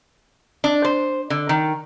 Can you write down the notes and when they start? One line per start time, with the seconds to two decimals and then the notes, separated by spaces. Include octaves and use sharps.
0.64 D4
0.85 C5
1.30 D3
1.49 D#3